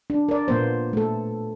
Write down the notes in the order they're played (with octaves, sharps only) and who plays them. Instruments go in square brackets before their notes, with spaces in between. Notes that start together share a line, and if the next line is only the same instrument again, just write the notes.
[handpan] D4
A#4 D5
A#2 A#3 B3 C5
A3 A4